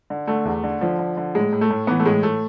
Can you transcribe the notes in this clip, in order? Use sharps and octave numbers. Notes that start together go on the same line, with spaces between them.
D3
D3 A3
E2
D3
D3 F3
D3
D3
A2 G#3
A2
A3
A2
E3 B3
A3
A2 G#3
A2 A3